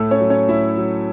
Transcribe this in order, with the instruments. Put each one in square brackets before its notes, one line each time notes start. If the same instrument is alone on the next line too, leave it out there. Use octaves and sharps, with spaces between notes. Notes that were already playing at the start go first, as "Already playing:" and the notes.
Already playing: [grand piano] A2 A3 A4
C#4 C#5
F#3
C#4 C#5
A2 E4 E5
F#3